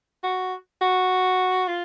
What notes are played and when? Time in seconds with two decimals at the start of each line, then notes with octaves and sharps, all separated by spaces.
0.23 F#4
0.81 F#4
1.68 F4